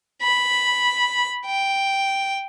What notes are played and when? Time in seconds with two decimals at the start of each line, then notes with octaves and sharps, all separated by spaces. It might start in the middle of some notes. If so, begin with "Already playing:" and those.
0.23 B5
1.46 G5